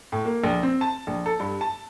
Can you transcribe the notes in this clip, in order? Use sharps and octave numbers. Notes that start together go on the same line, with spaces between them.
A2
A#3
A#1
C4
A5
A#1
A4
G2
A5